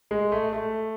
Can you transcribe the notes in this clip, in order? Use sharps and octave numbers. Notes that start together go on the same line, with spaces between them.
G#3
A3
A3